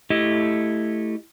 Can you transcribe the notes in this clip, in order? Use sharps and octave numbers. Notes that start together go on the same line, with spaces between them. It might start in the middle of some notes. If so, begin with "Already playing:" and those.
A3 E4 G4 D#5